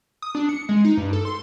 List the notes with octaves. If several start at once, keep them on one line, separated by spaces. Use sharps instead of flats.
D#6
D4
C#7
G#3
D#4
G2
A4
C6